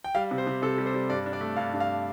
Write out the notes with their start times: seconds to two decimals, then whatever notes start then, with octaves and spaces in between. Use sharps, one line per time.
0.04 G5
0.15 G3 F5
0.31 C3
0.38 C5
0.47 C3
0.62 C3 A4
0.78 G3
0.86 C5
0.94 G3
1.10 G2 D5
1.26 D4
1.33 D5
1.41 A3
1.56 G2 F5
1.73 G2
1.80 F5